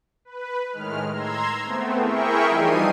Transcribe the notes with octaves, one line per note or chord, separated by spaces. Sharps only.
B4
A2 D#3 G#3 F6
A#5 C6 E6 G#6
A3 B3 C4
E4 G#4 A#4 E5 G5 C#6
E3 F3 G3 D#4 C7 D#7